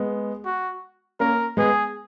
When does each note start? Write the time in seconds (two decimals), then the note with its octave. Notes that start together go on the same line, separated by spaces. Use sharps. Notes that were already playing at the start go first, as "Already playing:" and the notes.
Already playing: G#3 B3
0.45 F#4
1.20 A#3 C#4 A#4
1.57 G#3 B3 G#4